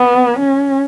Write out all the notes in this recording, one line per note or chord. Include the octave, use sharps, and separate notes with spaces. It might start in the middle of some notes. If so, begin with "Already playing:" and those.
Already playing: B3
C#4